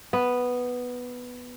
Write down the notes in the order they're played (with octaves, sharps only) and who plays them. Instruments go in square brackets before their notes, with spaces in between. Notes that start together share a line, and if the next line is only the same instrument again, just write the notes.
[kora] B3